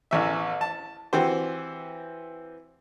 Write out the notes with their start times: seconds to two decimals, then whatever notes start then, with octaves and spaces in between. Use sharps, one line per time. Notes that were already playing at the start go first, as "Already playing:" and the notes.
0.11 A1 E2 E5
0.61 A5
1.13 E3 C4 F#4 G4 C5